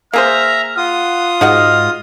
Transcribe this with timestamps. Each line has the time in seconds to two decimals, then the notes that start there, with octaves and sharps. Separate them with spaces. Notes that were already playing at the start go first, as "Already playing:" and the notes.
0.13 A#3 G#4 C5 E5 A#5 F6
0.77 F4 F#5 D#6
1.41 G#2 D#4 F#4 D#5 F6